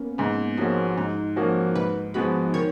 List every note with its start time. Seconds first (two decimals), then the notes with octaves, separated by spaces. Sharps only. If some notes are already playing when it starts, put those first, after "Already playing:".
Already playing: A#3 B3 C#4
0.18 G#2 B3
0.57 F3 G#3 A#3 C#4 F#4
0.97 G#2 D#4
1.36 F3 A#3 C#4 F#4
1.75 G#2 B4
2.14 F3 G#3 B3 F#4 B4
2.54 D#3 C#5